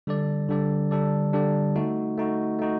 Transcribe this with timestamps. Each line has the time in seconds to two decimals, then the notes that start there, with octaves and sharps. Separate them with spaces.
0.07 D3 G3 D4 A4 D5
0.49 D3 G3 D4 A4 D5
0.91 D3 G3 D4 A4 D5
1.33 D3 G3 D4 A4 D5
1.76 A3 D#4 F#4
2.18 A3 D#4 F#4
2.59 A3 D#4 F#4